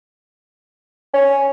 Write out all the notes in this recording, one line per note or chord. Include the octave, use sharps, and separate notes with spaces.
C#4